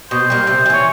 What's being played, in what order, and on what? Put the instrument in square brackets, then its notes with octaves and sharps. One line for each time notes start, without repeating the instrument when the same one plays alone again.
[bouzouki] B2 [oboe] C5
[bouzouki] G3 A#3
[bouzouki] C3 [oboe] C5
[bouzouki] G3
[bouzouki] E3 [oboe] C#5